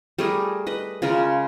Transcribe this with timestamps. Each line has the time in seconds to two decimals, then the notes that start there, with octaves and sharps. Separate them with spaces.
0.19 G3 A3 G#4 A#4
0.67 B4 D#5
1.02 C#3 G#3 F4 A#4